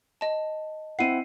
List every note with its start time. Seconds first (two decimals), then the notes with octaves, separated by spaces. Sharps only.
0.21 D#5 A5
0.99 C4 E4 F#5 C7 D#7